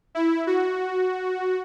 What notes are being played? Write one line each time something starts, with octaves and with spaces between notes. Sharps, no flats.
E4
F#4